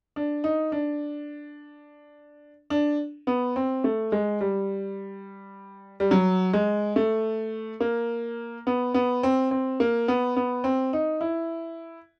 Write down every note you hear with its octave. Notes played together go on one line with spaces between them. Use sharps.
D4
D#4
D4
D4
B3
C4
A3
G#3
G3
G3
F#3
G#3
A3
A#3
B3
B3
C4
C4
A#3
B3
B3
C4
D#4
E4